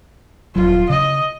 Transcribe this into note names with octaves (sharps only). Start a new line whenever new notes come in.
D#1 A#1 F#3 F4
C#3 D#5